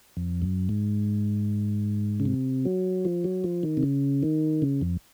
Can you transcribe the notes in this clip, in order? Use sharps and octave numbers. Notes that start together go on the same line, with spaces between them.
F2
F#2
G#2
C#3
C3
F#3
F3
F#3
F3
D#3
C3
C#3
D#3
C#3
F2